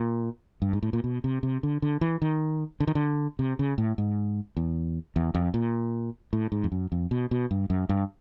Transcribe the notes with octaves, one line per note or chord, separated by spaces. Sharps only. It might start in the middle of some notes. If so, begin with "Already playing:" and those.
Already playing: A#2
G2
G#2
A2
A#2
B2
C3
C3
D3
D3
E3
D#3
D3
D#3
D3
C3
C#3
A2
G#2
E2
E2
F2
A#2
A2
G#2
F2
F#2
F2
B2
B2
G2
F#2
G2